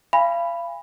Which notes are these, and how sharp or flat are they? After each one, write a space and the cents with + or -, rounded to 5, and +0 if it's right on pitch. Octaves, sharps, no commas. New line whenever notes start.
F5 -35 G#5 -30 B5 +0